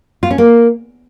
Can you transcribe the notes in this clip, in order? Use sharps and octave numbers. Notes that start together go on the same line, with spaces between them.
F4
C#4
A#3